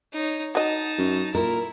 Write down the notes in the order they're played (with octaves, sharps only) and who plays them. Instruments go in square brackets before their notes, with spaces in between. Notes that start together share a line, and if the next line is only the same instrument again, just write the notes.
[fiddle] D#4 C#5
[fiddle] D#4 A5 [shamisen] F#4 D#5
[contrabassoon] F#2
[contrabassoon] A#2 [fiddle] E4 [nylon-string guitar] A#4